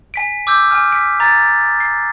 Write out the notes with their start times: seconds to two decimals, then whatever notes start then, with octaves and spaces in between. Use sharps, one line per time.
0.14 G#5 B6 D7
0.47 D6 E6 G6
0.71 G#5 F6
0.92 B6 D7
1.20 A#5 A6
1.80 C7